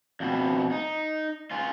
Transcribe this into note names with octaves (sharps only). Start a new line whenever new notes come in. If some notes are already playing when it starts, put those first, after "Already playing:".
F2 B2
D#4
C#4 F4